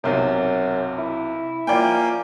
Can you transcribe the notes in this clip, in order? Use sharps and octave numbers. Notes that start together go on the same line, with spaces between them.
B1 F#2 C3
E4
F3 A#3 C#4 D5 G5